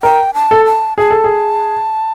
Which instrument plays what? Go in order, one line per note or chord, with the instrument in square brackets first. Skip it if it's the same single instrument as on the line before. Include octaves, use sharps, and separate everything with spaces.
[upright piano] A#4 [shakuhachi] G5
[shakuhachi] A5
[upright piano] A4
[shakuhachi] A5
[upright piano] G#4 [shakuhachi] A5
[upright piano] A4
G#4